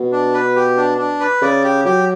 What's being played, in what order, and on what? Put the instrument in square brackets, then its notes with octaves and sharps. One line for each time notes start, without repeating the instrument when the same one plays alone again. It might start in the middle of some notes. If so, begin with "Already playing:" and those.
Already playing: [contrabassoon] B2
[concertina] D4
B4
G4
D4
D4
B4
[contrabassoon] C#3 [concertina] D5
[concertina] G4
[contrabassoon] F#3 [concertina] G4